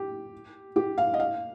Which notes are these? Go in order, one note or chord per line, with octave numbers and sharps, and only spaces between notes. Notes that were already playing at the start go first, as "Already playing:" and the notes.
Already playing: G4
G4
F5
D#5
F5